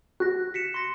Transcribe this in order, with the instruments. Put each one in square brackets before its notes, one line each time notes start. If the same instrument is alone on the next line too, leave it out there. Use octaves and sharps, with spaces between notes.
[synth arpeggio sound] F#4 [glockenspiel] F#6 A#6
[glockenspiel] B6 C#7 E7
C6 A#6 C#7